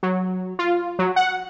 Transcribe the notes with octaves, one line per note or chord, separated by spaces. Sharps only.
F#3
F4
F#3
F#5